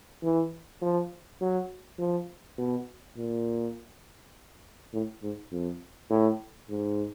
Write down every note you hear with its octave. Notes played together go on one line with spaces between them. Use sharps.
E3
F3
F#3
F3
B2
A#2
A2
G#2
F2
A2
G#2